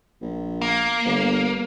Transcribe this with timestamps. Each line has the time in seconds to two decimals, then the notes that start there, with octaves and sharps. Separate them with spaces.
0.22 A#1
0.62 A#3
1.05 G1